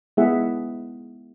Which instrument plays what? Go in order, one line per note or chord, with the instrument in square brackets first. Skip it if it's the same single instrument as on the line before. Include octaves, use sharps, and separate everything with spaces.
[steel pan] G#3 B3 E4 G#4 E5 F#5